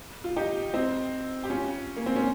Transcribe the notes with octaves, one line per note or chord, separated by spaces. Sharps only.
F4
D#4 G4
C4 D#4
G4
C#4 F4
A#3
C4
C#4